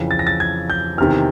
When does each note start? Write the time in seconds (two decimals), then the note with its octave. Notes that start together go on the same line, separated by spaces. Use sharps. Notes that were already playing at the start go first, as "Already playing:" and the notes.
Already playing: F2 C#3 E3
0.11 A6
0.19 A#6
0.27 A6
0.40 G#6
0.70 G6
0.98 E2 C3 D#3 F6